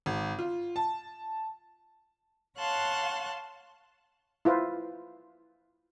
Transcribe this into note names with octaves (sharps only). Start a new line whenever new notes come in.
G#1
F4
A5
C#5 F5 F#5 A5 C6 F#6
E4 F4 B4 C5